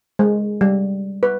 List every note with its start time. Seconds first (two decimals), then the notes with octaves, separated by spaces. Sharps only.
0.19 G#3
0.61 G3
1.23 B4